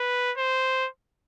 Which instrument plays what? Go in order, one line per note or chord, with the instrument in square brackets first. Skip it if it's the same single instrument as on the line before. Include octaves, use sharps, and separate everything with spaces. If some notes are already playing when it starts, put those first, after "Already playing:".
Already playing: [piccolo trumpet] B4
C5